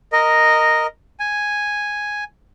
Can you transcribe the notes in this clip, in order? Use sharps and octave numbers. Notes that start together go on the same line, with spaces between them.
A#4 D#5
G#5